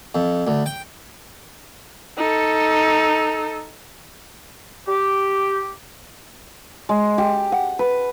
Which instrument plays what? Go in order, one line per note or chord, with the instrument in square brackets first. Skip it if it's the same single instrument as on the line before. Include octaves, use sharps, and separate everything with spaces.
[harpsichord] F2
D2
G5
[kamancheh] D#4 A4
[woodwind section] G4
[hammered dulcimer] G#3
G4
F#5
B4